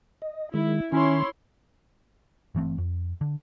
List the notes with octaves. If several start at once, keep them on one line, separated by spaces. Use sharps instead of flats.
D#5
D#3 G#3 E4
D#3 C#4 E4 C#5 C6
G1 E3 A3 C4
F2
D3